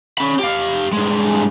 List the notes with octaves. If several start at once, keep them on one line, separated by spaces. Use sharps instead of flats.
C#4 B5
G4 F5
G2 G#3